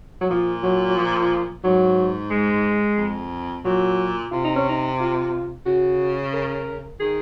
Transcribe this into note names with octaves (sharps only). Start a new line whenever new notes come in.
F#3
A#2 F3
F#3
F#3
F3
G#2 F#3
G#3
F2
A#2 F#3
C3 F4
D#4
C#4
D#4
F4
C#3 F#4
A#4
D#3 G#4